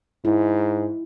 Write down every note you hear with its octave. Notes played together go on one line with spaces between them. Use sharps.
G#2 E4